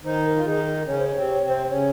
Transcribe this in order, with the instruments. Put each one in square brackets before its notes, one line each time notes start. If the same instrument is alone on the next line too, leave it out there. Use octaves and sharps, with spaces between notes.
[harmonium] D#3 D#4 [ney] C5
[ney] A#4
[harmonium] F4
[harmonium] D#3 D#4 [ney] G#4
[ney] A#4
[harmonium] C#3 C#4 [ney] C#5
[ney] C5
C#5
[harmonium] C3 C4
[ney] C#5
[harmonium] C3 C4
[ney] C5
[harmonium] C#3 C#4 [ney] C#5